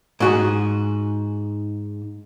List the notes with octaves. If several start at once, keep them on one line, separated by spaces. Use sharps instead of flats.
G#2 F#4 G#4